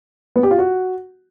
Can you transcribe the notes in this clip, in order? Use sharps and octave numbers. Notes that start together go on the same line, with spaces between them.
B3
G4
F4
F#4